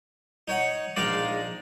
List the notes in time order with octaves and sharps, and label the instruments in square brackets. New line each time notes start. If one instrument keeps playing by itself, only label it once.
[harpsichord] D#4 C#5 F#5
[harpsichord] A#1 F5 D#6 [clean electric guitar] G#3 D#4 D5